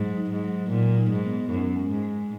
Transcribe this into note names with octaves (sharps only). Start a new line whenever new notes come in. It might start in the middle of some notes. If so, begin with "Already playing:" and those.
Already playing: G#2 F#3
D#4
G#2
F#3
A#2 F#3
D#4
G#2
B3
F#2 C#4
G#3
G#2
G#3